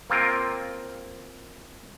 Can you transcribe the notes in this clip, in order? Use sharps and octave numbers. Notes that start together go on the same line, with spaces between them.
A#3 C4 F4 A#4